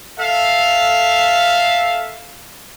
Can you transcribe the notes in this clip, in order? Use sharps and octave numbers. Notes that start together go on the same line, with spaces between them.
A4 E5 F5